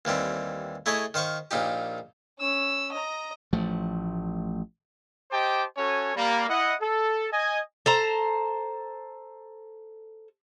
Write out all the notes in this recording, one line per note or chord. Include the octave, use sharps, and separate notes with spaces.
D#2 E3 G3 C4
A3 E4 G#4 C#5 D#5
D#3 C5 F5 C#6
A#1 A#2 D#4 G4
C#4 E6
D#5 A#5
A1 F3 A3
G4 C5 D#5 G5 A5 D6
C#4 F#4 A4 C#5 G#5
G3 A#3
E4 D#5 F#5
A4
D#5 G#5
A4 C5 A#5